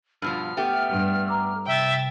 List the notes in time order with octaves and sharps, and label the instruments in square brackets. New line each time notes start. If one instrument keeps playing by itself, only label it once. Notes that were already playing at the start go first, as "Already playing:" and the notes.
[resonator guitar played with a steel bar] G2 B2 F3 [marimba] E6 [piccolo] F6
[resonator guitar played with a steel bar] A3 B3 G4
[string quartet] G2
[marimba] A#5 D6 E6
[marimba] C3 [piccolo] E5 [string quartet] G5 A6